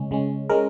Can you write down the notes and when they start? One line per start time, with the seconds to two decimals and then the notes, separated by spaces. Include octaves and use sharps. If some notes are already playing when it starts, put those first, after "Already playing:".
Already playing: C#3 G#3 C#4
0.11 C#3 G#3 C#4
0.50 G#3 C#4 A#4